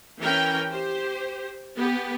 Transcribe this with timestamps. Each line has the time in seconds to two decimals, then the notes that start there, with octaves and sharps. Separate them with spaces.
0.21 E3 C#4 A#4 G5
0.69 G4 C5
1.76 B3 G4